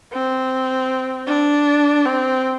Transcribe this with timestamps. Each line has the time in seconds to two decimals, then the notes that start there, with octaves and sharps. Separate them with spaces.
0.13 C4
1.28 D4
2.05 C4